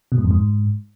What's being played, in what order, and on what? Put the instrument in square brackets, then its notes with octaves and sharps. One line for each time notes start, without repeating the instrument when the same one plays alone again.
[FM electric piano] B2
G#2
F2
G#2